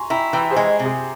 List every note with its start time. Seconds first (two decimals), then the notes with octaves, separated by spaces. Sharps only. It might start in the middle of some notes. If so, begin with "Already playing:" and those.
Already playing: G#5 A#5 C6 C#6
0.10 E4 G5 A#5
0.33 E3 G5 A#5
0.50 G#4 C5
0.56 G#3
0.79 C3
0.85 G#4